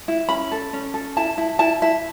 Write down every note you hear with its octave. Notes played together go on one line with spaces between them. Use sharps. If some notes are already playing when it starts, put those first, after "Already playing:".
E4
C#4 B5
A4
C#4
A4
E4 A5
E4
E4 A5
E4 E5